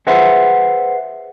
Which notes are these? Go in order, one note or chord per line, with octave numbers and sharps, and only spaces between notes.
G#4 B4 C5 E5 F#5